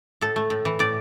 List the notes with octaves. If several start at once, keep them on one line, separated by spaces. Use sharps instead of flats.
A2 A4
A3
A2
E3
A2 D5